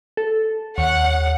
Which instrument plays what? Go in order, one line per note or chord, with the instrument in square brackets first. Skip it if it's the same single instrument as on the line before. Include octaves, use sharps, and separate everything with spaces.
[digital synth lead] A4
[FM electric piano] D#2 [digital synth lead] C#5 [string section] F#5